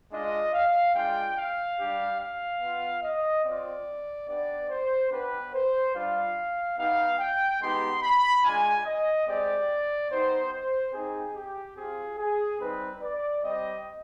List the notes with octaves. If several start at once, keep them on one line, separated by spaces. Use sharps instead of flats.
G#3 D4 F4 D#5
F5
G#3 D4 F4 G5
F5
G3 D4 G4
F5
B3 F4
D#5
C4 F4 D5
B3 D4 G4 D5
C5
B3 D4 G4 B4
C5
G3 D4 F4 F5
B3 D#4 G4 F5
G5
G#3 B3 D#4 G4 C6
B5
G#3 D4 F4 G#5
D#5
G#3 C4 G4 D5
B3 D#4 G4 C5
C5
C4 D#4 G4 G#4
G4
C4 F4 G#4
G#4
G3 C4 D#4 B4
D5
G3 C4 G4 D#5